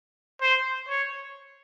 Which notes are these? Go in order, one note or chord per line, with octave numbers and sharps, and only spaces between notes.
C5
C#5